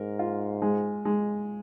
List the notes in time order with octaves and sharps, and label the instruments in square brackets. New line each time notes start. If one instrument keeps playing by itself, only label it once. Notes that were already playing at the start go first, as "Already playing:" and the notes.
Already playing: [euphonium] G#2 [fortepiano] A#4
[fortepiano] F4
G#3
G#3